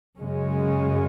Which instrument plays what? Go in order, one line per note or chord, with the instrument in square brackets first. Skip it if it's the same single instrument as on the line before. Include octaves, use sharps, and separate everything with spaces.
[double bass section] F#2 C#3 G#3 C#4